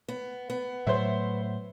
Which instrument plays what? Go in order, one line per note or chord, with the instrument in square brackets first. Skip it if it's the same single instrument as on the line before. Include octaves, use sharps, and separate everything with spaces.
[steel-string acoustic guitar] B3
B3
[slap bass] A2 F#3 A3 [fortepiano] C5 C#5 E5